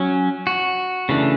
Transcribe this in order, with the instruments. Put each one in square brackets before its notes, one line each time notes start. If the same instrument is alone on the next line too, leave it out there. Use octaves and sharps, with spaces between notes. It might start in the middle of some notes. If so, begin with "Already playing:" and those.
Already playing: [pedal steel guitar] F#3 C#4
F#4
C#3 E3 A3 D4